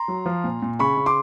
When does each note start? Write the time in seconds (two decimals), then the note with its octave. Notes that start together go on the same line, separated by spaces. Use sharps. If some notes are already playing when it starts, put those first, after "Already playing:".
Already playing: A#5 C6
0.08 F#3
0.26 F3
0.44 A#2
0.62 A#2
0.79 C#3 B5 C#6
0.97 C#3
1.06 C6 D6